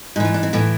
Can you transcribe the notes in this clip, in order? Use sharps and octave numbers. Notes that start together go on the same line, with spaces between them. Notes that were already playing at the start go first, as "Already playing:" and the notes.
G#2 E3 F4 G#4
D4
C4
A2 E3 B3